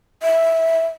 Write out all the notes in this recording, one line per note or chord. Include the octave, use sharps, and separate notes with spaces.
E5